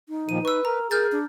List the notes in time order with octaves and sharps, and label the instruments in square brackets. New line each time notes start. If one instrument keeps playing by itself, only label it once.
[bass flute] D#4
[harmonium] A#2 D#3 F3 [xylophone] D#7
[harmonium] B4 [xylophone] C#6 E6
[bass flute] A#4 [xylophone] A#5
[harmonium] G#4 [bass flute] A#4 [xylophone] F6 G6 A6
[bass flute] D4